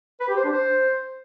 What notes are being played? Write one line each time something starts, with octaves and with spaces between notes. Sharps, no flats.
B4
G4
C5
D4
C5